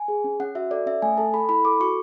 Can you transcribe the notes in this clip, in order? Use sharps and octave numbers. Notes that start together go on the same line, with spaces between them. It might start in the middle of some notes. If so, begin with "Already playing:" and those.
Already playing: G#5
G#4
C#4
C#4 F#5
F#4 E5
A4 D5
C#4 E5
A3 G#5
A4 A5
A4 B5
E4 B5
A4 D6
F#4 C#6